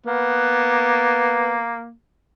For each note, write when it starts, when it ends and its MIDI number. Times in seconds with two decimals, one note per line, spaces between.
0.06 1.93 58
0.06 1.60 59